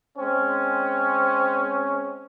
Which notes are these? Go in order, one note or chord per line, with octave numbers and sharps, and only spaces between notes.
G#3 C4 C#4